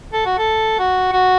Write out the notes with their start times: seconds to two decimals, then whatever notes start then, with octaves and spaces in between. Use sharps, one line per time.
0.13 A4
0.26 F#4
0.38 A4
0.79 F#4
1.12 F#4